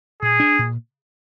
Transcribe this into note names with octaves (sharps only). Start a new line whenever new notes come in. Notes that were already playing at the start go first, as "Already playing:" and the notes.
A#2 G#4
D4
A#2